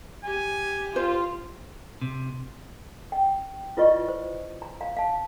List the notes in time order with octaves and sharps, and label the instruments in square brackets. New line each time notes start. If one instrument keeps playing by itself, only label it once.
[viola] G4 [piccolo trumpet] G#5
[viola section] F4 [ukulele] C5
[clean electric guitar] C3
[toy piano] G5
E4 F4 B4 D5 D#5 C#6
C5
A#5
F5 A#5
F5 A5